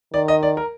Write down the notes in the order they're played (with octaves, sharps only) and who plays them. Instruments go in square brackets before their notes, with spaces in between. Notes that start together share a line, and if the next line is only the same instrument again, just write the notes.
[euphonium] D#3 [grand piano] D5
[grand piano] D#5
D5
A#4